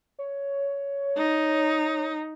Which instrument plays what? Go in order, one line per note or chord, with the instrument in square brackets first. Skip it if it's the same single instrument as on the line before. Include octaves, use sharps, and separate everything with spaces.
[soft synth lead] C#5
[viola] D#4